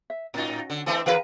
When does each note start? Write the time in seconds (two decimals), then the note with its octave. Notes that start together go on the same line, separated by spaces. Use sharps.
0.10 E5
0.34 A2 C#4 D#4 F#4
0.70 D3
0.86 E3 A3 C4 D#5 A5
1.06 E3 G#4 A#4 B4 F5 G5